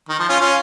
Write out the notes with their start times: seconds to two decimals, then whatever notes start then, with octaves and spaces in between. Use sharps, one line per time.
0.09 D#3
0.19 F3
0.29 C#4 F4
0.40 C#4 F4